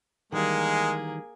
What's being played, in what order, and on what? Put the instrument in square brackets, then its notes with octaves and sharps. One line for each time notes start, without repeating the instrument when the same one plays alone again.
[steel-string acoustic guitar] D#3 E3 G3 [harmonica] G#3 [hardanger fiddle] A#3 G#4